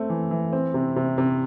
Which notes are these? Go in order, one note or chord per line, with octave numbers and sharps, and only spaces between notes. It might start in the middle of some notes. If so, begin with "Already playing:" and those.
Already playing: A3 C4
E3
E3
C4
C3
C3
C3